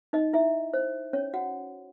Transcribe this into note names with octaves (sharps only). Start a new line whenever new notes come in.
D#4 D#5
E4 E5
C5
C#4 C#5
F#4 F#5